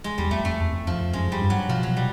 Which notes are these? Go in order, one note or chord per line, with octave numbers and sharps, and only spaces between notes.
G#3
E2 G3
F2 A3
F2 A3
E2
F2
F2 F3
F2
F#2 G#3
F2 G3
G2
F#3
B2 F3
B2 F#3
G3